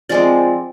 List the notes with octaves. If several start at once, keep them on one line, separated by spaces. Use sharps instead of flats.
F3 G#3 C4 D5